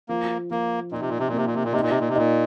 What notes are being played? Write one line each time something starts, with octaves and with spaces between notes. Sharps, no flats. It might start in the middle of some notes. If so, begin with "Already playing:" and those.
F3 A#3
F3 A#3
A#2 D#4
C3
A#2
C3
A#2
C3 A#3
A#2
C3
A#2
C3 D#4
A#2
C3
A#2
C3
A#2 D#4